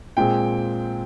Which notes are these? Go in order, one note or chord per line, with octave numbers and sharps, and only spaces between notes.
A#2 G#3 C4 G5